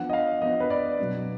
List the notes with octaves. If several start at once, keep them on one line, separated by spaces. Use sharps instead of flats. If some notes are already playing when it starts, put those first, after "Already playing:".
Already playing: F3 B3 D4 F#5
D#5
F5
F3 B3 D4 D#5
B4
D5
B2 F#3 B3 D4